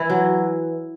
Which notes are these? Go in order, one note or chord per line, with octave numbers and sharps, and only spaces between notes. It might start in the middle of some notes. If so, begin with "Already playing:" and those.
Already playing: E3 E4
F#3